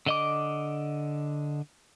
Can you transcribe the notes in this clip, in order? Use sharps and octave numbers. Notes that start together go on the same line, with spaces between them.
D3 D#5 D6